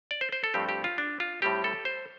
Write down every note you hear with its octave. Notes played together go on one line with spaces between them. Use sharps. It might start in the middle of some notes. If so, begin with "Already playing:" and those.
D5
C5
C5
A4
G2 F3 A3 C4 G4
G4
F4
D4
F4
A2 G3 C4 G4
A4
C5